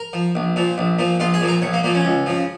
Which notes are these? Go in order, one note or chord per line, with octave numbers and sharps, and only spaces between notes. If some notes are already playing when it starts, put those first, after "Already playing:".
Already playing: A#4
F3
A#1
A#2 F3
A#1
A#2 F3
A#1 F4
G#4
A#2 F3
A#4
A#1 C#5
A#3
A#2 F3 A#3
C#4
C#2
C#3 F3